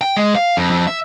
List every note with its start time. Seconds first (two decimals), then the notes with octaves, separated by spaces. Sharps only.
0.01 G5
0.16 G#3
0.35 F5
0.57 F2
0.70 F2
0.87 E5